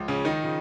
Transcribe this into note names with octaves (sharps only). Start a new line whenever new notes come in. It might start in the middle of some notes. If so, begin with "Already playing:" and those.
Already playing: C#2 F3
C#3 C#4
D#3 D#4
C#3 F3